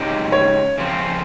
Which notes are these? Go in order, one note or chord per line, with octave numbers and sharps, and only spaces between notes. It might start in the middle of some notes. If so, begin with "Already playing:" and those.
Already playing: C#3 G#3 D#4 G4
C#5
C#3 F3 C4